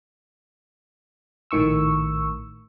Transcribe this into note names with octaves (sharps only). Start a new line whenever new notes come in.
A#1 A2 D#3 C#6 E6